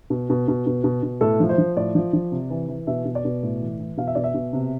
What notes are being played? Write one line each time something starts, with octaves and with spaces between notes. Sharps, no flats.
B2
B2
B2
B2
B2
B2
A2 A4
F3
C5
F3
A2 D5
F3
F3
C3
E3
E3
B2 E5
B2
D5
B2
A2
E3
E3
B2 F5
E5
B2 D5
E5
B2
C3